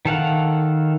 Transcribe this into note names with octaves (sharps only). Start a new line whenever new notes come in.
D#3 A4 F5 F#5